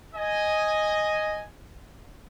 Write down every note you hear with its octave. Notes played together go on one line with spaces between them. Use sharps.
D#5 G#5